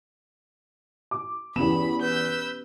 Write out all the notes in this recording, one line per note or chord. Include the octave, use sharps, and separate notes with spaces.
D6
E2 B3 C#4 G4 B5 E7
B4 E6 G6